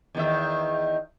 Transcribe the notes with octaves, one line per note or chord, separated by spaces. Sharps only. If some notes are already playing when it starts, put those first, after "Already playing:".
E2 D#3 E5